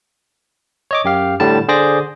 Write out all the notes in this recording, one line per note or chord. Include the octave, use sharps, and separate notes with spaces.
C#5 D#5 D6
F#2 G4 F5
A2 D3 G3 A5
D3 G#4 C5 D5 D6 A#6